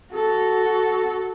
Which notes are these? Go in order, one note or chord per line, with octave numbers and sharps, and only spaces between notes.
F#4 A4